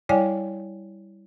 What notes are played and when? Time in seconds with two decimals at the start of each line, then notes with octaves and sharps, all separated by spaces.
0.09 G3 E4 C#5 D5 G5 G#5